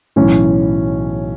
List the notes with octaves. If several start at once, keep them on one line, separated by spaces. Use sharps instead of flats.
B1 A2 E3 C#4